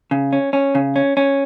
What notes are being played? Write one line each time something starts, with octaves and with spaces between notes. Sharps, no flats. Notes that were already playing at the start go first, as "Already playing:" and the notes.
C#3
C#4
C#4
C#3
C#4
C#4